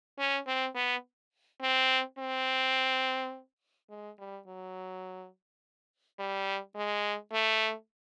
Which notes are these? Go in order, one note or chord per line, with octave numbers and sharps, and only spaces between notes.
C#4
C4
B3
C4
C4
G#3
G3
F#3
G3
G#3
A3